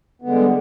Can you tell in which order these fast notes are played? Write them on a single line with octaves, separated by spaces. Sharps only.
B3 D3 G#3 G3